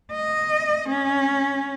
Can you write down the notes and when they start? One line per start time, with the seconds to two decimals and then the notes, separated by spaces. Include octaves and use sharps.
0.13 D#5
0.89 C#4